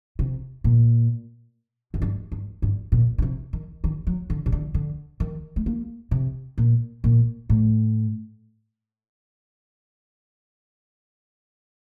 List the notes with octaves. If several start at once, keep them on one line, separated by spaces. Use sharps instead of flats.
C3
A#2
F#2
G2
G2
G2
A#2
D3
C3
D#3
D#3
F#3
D3
C3
D3
D3
D#3
A3
A#3
C3
A#2
A#2
A2